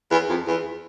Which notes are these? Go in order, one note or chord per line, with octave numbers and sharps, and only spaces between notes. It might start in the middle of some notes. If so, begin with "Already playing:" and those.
E2
F2
E2